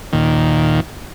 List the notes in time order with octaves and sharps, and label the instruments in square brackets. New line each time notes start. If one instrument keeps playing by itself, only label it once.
[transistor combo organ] D#2 A#2 D#3